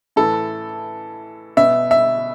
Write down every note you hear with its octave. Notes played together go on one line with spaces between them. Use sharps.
A2 E3 A4
B2 E5
E5